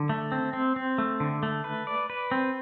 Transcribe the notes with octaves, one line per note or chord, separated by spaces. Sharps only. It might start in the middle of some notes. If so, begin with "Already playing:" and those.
Already playing: D3
A3
C4
C4
C4
A3
D3
A3
B4
D5
B4
C4